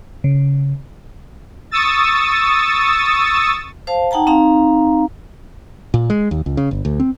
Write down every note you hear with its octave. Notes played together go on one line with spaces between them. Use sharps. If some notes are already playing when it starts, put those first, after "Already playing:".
C#3
C#6 D#6 E6 A6
C5 F5 A5
D#4 F#5 G5 A5 A#5
C4 D#4 F5 A#5
A#2
G#3
D#2
C#2
C#3
G1
D2
C4